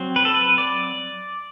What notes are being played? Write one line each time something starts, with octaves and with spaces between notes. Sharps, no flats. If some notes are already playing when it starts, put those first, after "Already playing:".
Already playing: F#3 C4
B4
A4
B4
D5